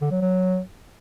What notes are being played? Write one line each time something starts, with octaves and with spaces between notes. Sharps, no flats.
D3
F#3
F#3